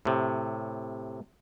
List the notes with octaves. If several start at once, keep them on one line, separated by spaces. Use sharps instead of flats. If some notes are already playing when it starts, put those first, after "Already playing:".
A2 C3